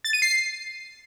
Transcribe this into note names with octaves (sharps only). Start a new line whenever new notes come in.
A6
D#7
C7